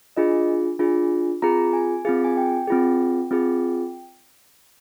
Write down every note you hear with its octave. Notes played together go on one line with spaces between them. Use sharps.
D4 F4 G#4 D#5
D4 F4 G#4
C4 F4 G#4 A#5
G#5
C4 F4 G#4 F5
G#5
G5
C4 F4 G#4
C4 F4 G#4